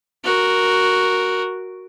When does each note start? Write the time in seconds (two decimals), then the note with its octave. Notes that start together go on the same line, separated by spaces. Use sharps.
0.25 F#4 A#4